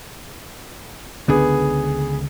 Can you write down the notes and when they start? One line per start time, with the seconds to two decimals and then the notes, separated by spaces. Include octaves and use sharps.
1.28 C#2 D3 B3 G#4